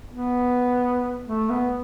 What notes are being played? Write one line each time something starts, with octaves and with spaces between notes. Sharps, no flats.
B3
A3
B3